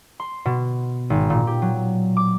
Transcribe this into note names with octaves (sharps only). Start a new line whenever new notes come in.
C6
B2
G#1
A#2
G4
F#3
D6